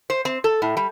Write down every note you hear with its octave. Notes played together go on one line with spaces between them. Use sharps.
C5
C4
A4
A2
G3